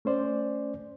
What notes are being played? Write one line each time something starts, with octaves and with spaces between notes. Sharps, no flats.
A3 C#4 C5 D5